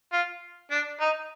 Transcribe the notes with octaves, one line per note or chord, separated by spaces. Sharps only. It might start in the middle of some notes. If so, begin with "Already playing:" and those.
F4
D4
D#4